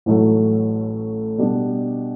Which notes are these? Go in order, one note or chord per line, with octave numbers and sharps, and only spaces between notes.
A1 A2 F#3 A3
B2 G3 D4